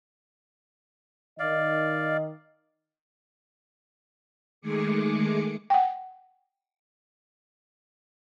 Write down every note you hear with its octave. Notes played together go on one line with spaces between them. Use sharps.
D#3 D5 D#5 F5
D#3 G#3 A3 G#4 D6 C#7
F#5 G5